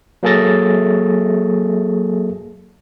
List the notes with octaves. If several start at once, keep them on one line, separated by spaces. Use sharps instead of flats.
F#3 A#3 G#4 A4 A6 A#6